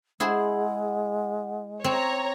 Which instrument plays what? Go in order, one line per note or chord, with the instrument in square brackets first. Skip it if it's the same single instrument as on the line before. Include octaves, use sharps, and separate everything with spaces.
[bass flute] G#3 [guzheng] E4 G#4 C5 [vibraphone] F#5
[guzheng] C4 [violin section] C#5 A#5